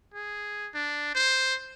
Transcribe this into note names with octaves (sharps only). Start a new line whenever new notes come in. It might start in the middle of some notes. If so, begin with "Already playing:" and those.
G#4
D4
C5